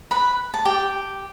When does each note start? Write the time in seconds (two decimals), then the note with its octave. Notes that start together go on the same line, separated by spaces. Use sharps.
0.11 B4 B5
0.54 A5
0.65 G4 G5